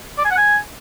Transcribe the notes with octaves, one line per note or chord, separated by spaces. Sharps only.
D5
G#5
F#5
G#5